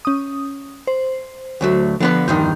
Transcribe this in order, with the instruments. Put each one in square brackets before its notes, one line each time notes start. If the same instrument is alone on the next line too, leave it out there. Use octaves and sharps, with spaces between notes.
[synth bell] C#4 D#6
C5
[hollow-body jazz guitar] D2 F#3 A3
[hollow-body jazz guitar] D3 B3 B4 [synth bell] F3
[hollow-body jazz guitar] E2 G2 D#3 [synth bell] D#4 C6 G6